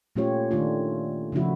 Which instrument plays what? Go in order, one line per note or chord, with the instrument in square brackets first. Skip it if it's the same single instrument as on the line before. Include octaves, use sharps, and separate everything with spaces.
[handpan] A#2 A3 C#4 F4 G4 C#5
D#3 A3 D4 F4
C#3 F3 A3 E4 F#4